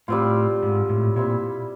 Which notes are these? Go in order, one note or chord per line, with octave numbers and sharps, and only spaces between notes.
A2 G3 C4 F4
G#2
A2
A#2 G3 C4 E4